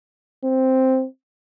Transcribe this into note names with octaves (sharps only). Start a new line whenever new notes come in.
C4